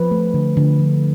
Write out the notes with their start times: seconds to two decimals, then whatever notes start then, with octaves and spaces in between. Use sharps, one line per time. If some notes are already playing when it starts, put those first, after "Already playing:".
Already playing: F3 B4
0.11 A3
0.34 D3
0.57 D3
0.79 F3